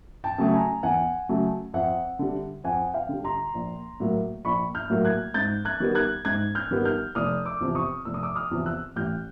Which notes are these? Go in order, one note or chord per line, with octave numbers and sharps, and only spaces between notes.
G5 A5
C#3 F#3 A3
G#5 A#5
E2 F#5 G#5
C#3 F#3 A3
F2 E5 F#5
D3 G3
F2 F#5 G#5
F5 G5
D3 G3
A#5 C6
A#1
A2 F#3 A#3
A#1 B5 C#6
F6 G6
A2 F#3 A#3
F#6 G#6
G#2 G6 A6
F#6 G#6
D#3 G3 B3
F#6 G#6
G#2 F#6 G#6
F6 G6
D#3 G3 B3
F6 G6
F1 D#6 F6
D6 E6
E2 C3 F3
C#6 D#6
F1 E6
D#6
D6 E6
D#6 F6
E2 C3 F3
E6 F#6
A1 F6 G6